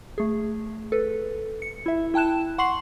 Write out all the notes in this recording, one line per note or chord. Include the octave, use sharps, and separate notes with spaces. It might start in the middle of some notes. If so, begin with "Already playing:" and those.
A3 G#4
A4 B4
C#7
E4 E5
E4 G5 A5 F#6 E7
F#5 C6 C#6 C7 F#7